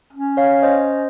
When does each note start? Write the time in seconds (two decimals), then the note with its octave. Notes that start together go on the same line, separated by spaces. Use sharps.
0.13 C#4
0.37 C#5 F5
0.62 C5 D#5